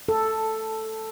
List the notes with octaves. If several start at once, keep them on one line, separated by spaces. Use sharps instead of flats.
A4